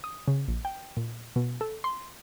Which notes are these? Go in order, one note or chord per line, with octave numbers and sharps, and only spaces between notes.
D#6
C#3
A#1
G5
A#2
B2
A4
C6